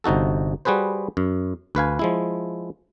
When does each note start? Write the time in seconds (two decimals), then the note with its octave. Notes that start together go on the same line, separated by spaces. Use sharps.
0.04 G1 C3 D#4 F#4 A4
0.65 G3 F#4 G#4 B4 C5
1.17 F#2
1.75 D2 B4 F5 G#5
1.99 F3 G#3 E4